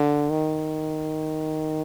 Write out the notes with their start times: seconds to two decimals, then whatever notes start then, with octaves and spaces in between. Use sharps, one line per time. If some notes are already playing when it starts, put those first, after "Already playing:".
Already playing: D3
0.30 D#3